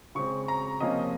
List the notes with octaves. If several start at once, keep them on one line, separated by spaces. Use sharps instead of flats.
C#3 G#3 C4 C#6
A#5
C3 F3 A#3 C#4 D#5